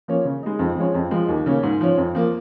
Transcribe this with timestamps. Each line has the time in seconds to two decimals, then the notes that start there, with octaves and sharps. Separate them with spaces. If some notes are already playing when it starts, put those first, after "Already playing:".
0.08 F3 A#3 C#4
0.25 C#3
0.43 G#3 D#4
0.59 F2
0.76 F3 G#3 C#4
0.94 F2
1.11 F3 G#3
1.29 D#2
1.46 C#3 A#3 C#4
1.63 G#2
1.81 F3 C#4
1.97 F2
2.15 F3 A#3